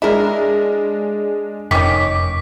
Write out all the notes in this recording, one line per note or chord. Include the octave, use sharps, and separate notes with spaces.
G#3 D4 E4 A#4
F1 D#3 C#4 C#6 D6 B6